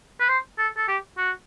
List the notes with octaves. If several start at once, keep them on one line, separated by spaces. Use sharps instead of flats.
B4
C5
A4
A4
G4
F#4